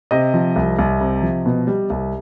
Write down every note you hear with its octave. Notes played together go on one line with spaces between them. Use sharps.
C3 D#5
F3
C2
C2
C3
F3
B2
G3
C2